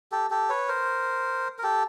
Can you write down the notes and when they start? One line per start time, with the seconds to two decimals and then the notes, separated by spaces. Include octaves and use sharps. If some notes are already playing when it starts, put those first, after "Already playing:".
0.12 G4 A4
0.30 G4 A4
0.50 B4 C#5
0.68 A#4 C5
1.59 A#4
1.63 G4 A4